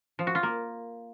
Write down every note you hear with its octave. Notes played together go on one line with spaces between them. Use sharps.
F3
F#4
F4
A#3